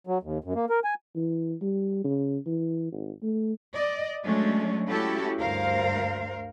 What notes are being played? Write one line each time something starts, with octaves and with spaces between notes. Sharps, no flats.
F#3
D#2
F#2
A#3
A#4
G#5
E3
G3
C#3
E3
G#1
A3
D5 D#5
F#3 G#3 A3 C#4 D4
A3 C#4 E4 F#4 G4 A4
D2 G2 A#4 C5 F5